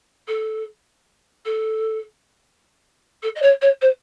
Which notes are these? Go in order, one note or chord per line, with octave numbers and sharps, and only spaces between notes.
A4
A4
A4
D#5
C#5
C#5
C5